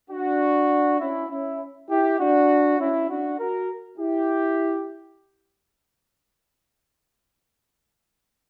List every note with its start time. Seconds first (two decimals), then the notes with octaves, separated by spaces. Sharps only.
0.10 D4 F#4
1.00 C#4 E4
1.29 C#4 E4
1.89 E4 G4
2.19 D4 F#4
2.79 C#4 E4
3.09 D4 F#4
3.38 F#4 A#4
3.98 E4 G4